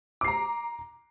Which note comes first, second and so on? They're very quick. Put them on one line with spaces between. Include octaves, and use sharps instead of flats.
D6 C7 A#5